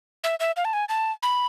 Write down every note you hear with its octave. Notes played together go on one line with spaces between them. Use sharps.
E5
E5
F5
A5
G#5
A5
B5